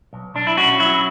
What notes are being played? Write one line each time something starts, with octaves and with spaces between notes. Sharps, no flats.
B1
B1 D4
E4
C#4 F#4
F#3 E4